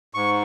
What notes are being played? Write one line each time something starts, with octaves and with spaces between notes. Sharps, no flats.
G#2 C#6